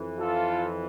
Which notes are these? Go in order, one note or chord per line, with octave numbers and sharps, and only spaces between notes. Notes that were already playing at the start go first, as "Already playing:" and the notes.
Already playing: F2 E3
F4 A4